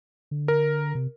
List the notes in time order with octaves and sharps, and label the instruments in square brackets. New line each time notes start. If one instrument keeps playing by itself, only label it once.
[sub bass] D3
[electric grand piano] A#4
[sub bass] C3